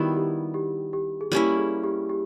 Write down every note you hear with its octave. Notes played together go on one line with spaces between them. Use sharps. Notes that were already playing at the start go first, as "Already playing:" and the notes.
Already playing: D#3 G3 B3 E4 F#4
G4
G4
G4
G#4
G3 A#3 C#4 E4 G4
G#4
G4
G4